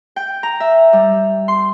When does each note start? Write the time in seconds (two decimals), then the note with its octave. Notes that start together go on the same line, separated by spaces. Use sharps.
0.16 G5
0.43 A#5
0.60 E5
0.93 G3
1.48 C6